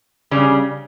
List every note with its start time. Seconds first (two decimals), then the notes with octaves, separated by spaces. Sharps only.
0.31 C#3 G3 C#4